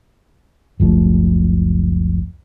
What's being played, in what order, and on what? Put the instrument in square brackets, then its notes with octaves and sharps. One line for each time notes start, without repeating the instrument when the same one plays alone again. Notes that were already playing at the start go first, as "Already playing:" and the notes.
[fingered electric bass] F#1 C#2 F3 A3